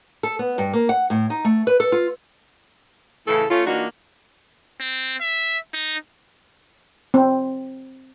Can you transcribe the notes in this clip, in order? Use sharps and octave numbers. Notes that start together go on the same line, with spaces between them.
A4
B3
G2
A#3
F#5
A2
D#4
A3
B4
A4
F4
A2 C#3 E3 A4
A3 C#4 F4
E3 A#3 D4 D#4 F4 F#4
C4
E5
D#4
C4